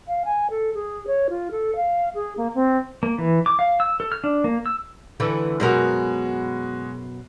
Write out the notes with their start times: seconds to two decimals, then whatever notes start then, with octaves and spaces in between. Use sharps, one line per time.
0.08 F5
0.25 G#5
0.50 A4
0.74 G#4
1.07 C#5
1.30 F4
1.51 A4
1.76 F5
2.15 G#4
2.37 A#3
2.55 C4
3.03 A#3
3.18 E3
3.46 D6
3.59 F5
3.80 E6
4.00 A4
4.12 F6
4.24 D4
4.44 A#3
4.66 E6
5.20 D3 E3 A3
5.60 F#2 B2 G#3 F#4 A#4